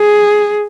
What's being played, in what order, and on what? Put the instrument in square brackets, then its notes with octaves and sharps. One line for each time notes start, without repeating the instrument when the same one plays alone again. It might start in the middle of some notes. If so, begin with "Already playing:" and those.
Already playing: [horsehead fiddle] G#4